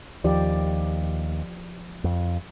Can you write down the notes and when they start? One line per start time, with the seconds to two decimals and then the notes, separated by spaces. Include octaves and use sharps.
0.24 D#2 F3 G4 D5
2.04 F2